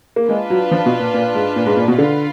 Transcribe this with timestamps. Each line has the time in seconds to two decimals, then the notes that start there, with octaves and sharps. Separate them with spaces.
0.16 A#3
0.29 G#3 D4 F4 B4
0.50 F#3
0.71 F3
0.86 B2
1.00 A#2
1.14 A#2
1.35 G#2
1.56 A#2
1.66 G#2
1.77 A#2
1.88 B2
1.98 D3 F4 B4 F5